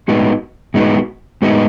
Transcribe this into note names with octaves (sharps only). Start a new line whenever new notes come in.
A2 G#3 B3 D#4 F#4
A2 G#3 B3 D#4 F#4
A2 G#3 B3 D#4 F#4